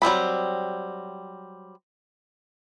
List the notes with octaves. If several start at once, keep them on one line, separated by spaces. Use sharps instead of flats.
F#3 G3 C4 B5